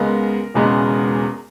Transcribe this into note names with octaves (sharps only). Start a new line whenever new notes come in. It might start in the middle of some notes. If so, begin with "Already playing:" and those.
Already playing: C#2 C#3 G#3 B3 A#4
E1 E2 C#3 G#3 B3